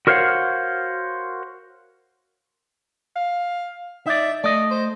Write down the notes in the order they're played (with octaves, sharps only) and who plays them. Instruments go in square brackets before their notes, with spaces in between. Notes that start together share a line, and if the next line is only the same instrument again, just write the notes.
[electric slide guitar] F#4 A#4 C5 C#5 F5 F#5
[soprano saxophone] F5
[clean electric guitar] D#4 D5 [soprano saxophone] E5
[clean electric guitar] A3 D#5 [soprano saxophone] D5
[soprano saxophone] C5